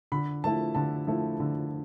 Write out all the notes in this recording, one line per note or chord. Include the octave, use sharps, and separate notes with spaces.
D3 B5
F3 A3 E4 A5
D3 A5
F3 A3 E4
D3